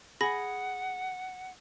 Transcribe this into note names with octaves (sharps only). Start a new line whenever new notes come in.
G#4 F#5 B5 A#6